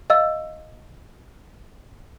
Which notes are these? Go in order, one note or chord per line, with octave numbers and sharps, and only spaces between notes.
D#5 F5 E6